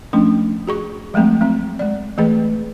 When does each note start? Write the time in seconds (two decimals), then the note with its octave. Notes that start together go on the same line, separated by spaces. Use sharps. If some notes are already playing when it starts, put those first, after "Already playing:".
0.13 F3 A3 C#4 D4
0.67 F#4 G#4 C#6
1.14 F3 F#3 G#3 A3 C4
1.41 F#3 C4
1.79 G#3 D5
2.18 E3 A3 G#4 B4